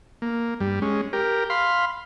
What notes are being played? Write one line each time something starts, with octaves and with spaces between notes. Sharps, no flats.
A#3
G2 G3
G#3 C#4
G4 A#4
F5 B5 C6